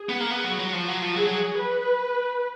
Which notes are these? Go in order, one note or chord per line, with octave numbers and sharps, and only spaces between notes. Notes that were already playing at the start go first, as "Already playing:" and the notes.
Already playing: G#4
B3
A#3
B3
F#3
F#3
F3
F#3
F3
F#3 G#4
F#3
B4